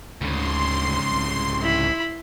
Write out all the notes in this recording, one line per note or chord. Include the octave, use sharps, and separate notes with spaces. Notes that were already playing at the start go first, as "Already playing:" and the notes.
D2 G#2 C#3 C6
C2
E4 B5